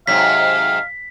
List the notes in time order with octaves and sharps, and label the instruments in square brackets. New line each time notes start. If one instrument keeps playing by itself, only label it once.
[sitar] G#2 C3 F#3 [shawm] F5 [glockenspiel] B6